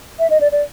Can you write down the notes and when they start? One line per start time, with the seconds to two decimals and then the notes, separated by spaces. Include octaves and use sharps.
0.19 E5
0.30 D#5
0.41 D5
0.52 D5